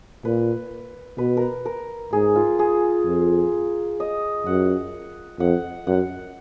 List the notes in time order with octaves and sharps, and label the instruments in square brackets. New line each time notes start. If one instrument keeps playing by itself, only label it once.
[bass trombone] A#2 [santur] B4
[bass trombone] B2 [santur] B4
[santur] A#4 B4
A#4
[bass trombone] G#2 [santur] G#4
[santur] F4
G#4
[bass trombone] F2
[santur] D#5
[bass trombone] F#2 [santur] F#5
[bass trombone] F2 [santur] F#5
[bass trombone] F#2 [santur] F#5